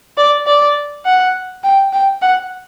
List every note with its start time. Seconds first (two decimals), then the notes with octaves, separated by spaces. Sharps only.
0.17 D5
0.47 D5
1.05 F#5
1.64 G5
1.93 G5
2.22 F#5